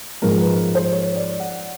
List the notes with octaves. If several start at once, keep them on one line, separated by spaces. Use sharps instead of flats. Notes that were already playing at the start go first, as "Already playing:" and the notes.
G#2 F3 G#3 A#4
B4
C5
C#5
D5
F#5